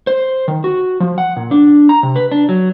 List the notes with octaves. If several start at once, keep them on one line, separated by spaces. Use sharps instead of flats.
C5
D#3
F#4
F3
F#5
A#2
D4
A#5
C3
B4
D4
F#3